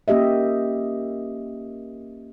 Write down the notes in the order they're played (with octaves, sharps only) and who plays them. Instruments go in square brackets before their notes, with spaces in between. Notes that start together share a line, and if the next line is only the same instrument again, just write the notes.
[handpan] A#3 C#4 G4 D#5 E5